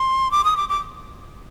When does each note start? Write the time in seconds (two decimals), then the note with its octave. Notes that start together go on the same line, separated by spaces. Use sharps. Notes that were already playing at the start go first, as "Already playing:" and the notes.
Already playing: C6
0.31 D6
0.45 D#6
0.57 D6
0.69 D6